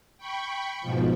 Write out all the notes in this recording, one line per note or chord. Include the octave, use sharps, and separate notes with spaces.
G5 B5 C#6
G#2 B2 F3